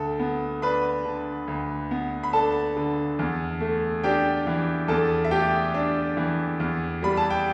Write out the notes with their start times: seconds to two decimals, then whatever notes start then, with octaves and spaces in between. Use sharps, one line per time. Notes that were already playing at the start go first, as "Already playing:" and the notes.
Already playing: D2 A4
0.19 B3
0.62 D4 B4 B5
1.05 D3
1.48 D2
1.91 B3
2.23 B5
2.33 D4 A4 A5
2.76 D3
3.19 E2
3.60 A3
4.04 D4 G4 G5
4.47 E3
4.88 E2 A4 A5
5.24 E5
5.31 A3 G4 G5
5.74 D4
6.17 E3
6.60 E2
7.03 G3 B5
7.17 A5
7.30 G5